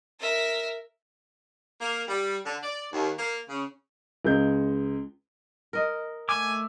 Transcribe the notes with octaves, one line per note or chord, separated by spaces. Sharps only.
A#4 E5
A#3
G3
D3
D5
D#2
A#3
C#3
C#2 G#3 G6
A#4 D#5
A3 G#5 D6